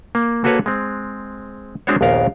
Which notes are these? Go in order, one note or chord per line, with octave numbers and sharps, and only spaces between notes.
A#3
A#3 F#4 A4 B4 C#5
G#3 C4
G#3 C4 D4 F#4 C5 C#5
A#1 D#2 B3 A#4 F5